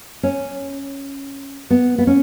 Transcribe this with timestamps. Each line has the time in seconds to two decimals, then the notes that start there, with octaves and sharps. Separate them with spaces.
0.23 C#4
1.70 B3
1.98 B3
2.07 C#4